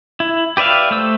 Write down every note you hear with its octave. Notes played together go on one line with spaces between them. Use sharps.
E4
G4 B4 D5 E5 F5
A3 C5 E6